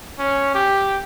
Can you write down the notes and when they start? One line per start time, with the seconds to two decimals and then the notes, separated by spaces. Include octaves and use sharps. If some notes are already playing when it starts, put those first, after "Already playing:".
0.19 C#4
0.55 G4